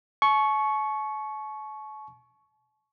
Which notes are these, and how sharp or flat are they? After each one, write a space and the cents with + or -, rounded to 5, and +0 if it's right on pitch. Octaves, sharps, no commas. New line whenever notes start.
A5 -45 C#6 +0